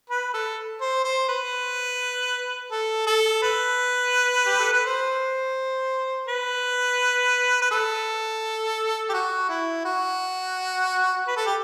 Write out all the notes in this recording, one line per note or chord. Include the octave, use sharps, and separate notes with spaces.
B4
A4
C5
C5
B4
A4
A4
B4
G4
A4
B4
C5
B4
B4
A4
G4
F#4
E4
F#4
B4
A4
G4